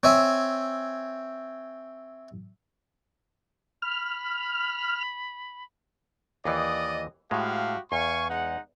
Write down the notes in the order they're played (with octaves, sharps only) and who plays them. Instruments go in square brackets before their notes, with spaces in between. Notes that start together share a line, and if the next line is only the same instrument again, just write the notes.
[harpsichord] C4 C#5 E5 G#5
[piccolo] B5 [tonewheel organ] F6
[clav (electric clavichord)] D#2 E3 [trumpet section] D5 D#5 D#6
[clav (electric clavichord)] A2 G#3 [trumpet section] F#4 G4 F5
[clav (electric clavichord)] E2 [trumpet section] F5 G#5 C#6
[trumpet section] G#3 D#4 F#5